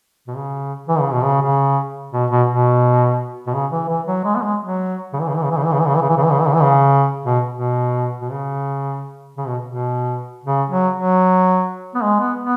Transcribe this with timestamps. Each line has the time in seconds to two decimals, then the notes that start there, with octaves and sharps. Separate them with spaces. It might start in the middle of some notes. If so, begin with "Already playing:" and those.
0.27 B2
0.36 C#3
0.88 E3
1.00 C#3
1.12 B2
1.24 C#3
1.41 C#3
2.13 B2
2.31 B2
2.48 B2
3.46 B2
3.54 C#3
3.72 E3
3.89 E3
4.07 F#3
4.24 G#3
4.36 B3
4.42 G#3
4.60 F#3
5.13 C#3
5.20 E3
5.28 C#3
5.36 E3
5.43 C#3
5.51 E3
5.57 C#3
5.65 E3
5.73 C#3
5.80 E3
5.87 C#3
5.95 E3
6.02 C#3
6.09 E3
6.17 C#3
6.24 E3
6.32 C#3
6.40 E3
6.47 C#3
6.54 E3
6.62 C#3
7.25 B2
7.52 B2
8.21 B2
8.32 C#3
9.37 C#3
9.47 B2
9.67 B2
10.44 C#3
10.70 F#3
10.96 F#3
11.94 B3
12.03 G#3
12.20 B3
12.39 B3